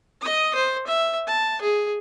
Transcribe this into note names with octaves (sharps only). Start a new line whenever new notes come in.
D#5 D#6
C5
E5
A5
G#4